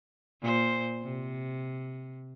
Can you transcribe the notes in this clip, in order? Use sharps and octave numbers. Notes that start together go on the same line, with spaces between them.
A#2 C5
C3